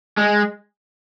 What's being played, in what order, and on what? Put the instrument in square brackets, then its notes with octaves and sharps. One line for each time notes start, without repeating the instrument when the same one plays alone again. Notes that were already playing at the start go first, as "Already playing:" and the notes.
[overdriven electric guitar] G#3